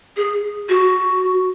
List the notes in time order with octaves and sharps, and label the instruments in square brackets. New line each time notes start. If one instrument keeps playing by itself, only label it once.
[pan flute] G#4
F#4